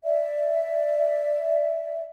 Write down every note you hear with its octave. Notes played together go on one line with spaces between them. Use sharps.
D5 E5